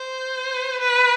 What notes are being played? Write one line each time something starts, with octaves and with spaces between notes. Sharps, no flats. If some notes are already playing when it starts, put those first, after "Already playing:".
Already playing: C5
B4